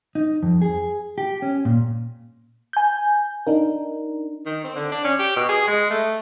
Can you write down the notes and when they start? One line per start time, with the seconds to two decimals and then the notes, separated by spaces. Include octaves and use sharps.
0.15 D#4
0.43 F2
0.62 G#4
1.18 G4
1.42 C#4
1.65 A#2
2.73 G#5 G6
3.47 D4 D#4 A#4
4.46 D#3
4.64 C4
4.75 D3
4.91 D4
5.04 C#4
5.19 G4
5.36 B2
5.49 G#4
5.67 G#3
5.90 A3